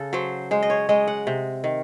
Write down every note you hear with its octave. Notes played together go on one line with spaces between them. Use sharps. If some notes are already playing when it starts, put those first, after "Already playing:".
Already playing: C#3 A4
F#3 C5
G#3 C5
D#5
C#5
G#3 D#5
F#5
C3
D#3